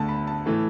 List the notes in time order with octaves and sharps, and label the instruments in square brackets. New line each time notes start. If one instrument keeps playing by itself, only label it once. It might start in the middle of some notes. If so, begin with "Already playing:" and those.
Already playing: [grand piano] D2 D3 A3 A5
B5
A5
A2 E3 A3